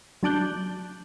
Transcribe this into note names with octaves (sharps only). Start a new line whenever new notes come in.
F#3 D4 A5 D6 F#6 G6